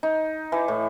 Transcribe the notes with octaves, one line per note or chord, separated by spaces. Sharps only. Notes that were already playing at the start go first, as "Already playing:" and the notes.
D#4
E3
A2